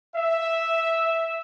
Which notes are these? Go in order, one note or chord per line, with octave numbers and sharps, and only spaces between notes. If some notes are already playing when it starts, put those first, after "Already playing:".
E5